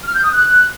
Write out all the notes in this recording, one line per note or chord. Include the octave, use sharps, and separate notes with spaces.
F6
G6
D#6
F#6